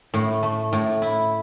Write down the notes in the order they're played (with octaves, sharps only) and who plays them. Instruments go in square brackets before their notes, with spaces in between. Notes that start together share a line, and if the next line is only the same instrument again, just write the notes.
[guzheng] A2
A3
A2
E4